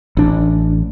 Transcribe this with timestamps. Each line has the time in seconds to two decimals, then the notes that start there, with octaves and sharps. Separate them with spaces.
0.17 A1 D4